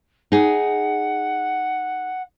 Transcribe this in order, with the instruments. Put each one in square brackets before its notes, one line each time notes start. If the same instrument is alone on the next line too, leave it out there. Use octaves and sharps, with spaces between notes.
[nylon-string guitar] D#4 G#4 [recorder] F#5